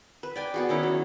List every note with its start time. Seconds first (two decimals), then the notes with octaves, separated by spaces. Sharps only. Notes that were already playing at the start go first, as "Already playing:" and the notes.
0.23 B4
0.36 D5 G5 G#5
0.54 B3 F#4 G#4
0.69 D#3 C#4 E4
0.83 F#3